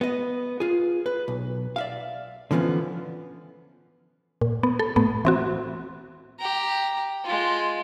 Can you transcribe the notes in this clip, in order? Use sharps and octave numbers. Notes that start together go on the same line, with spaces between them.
B3 D#5
F4 G#4
B4
B1
D5 E5 F5
D3 E3 F3 B3 C#4
A#2
B3
A4
A2 A3 B3
E3 C4 F#4
G4 A#5
G#3 F4